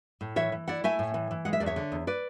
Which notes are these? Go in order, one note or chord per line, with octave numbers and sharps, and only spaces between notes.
A2
E3 C#5 E5
E3
E4 D5 F#5
A3 E5 G#5
A2
E3
E3
G#3 F#5
E5
E2 D5
C#5 E5
D3
E2
B4 D5